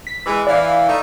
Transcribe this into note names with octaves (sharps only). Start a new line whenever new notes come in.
B6
E3 G#3
E3 D5 F5
A3 D#4